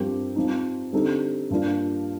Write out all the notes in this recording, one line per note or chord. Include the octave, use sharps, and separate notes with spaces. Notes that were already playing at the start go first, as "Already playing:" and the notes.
Already playing: G2 F3 C4 G4 A#4
F3 C4 D#4
D3 G3 C4 D#4 A4
G2 F3 A#3 D4 F4